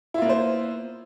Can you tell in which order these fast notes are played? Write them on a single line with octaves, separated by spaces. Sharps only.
E4 F4 A#3 B3 C5